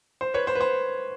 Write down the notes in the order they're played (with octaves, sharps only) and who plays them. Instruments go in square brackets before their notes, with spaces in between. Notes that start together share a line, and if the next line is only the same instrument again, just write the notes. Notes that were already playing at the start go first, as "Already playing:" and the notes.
[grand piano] C5
B4 C#5
C5
B4
C5